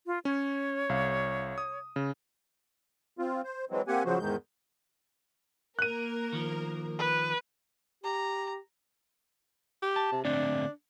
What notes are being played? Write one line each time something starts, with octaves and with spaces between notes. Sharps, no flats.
F4
C#4 C#5
C2 F5
D#6
C#3
C4 F4
C5
E3 F#3 G#3 C4
A#3 C4 G4 F#5 G#5
C#3 F3 F#3 F#4 C5
E2 G#2 D#3 G#3 G6
A#3 A#4 F#6 D#7
D#3 F3
B4
G4 A#5
G4
A5
C3
D3 A3 C4 D4